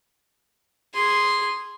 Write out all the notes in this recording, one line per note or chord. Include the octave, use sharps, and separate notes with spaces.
G#4 C6